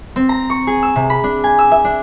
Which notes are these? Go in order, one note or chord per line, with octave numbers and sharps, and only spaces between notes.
C4
A#5
C#6
G#4
E6
C3
B5
D4
G#5
E6
E5
D4